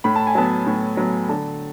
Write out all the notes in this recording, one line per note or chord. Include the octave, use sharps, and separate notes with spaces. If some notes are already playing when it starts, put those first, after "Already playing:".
A2 B5
A5
G#5
F#3 B3 A5
A2
F#3 B3
D3 A5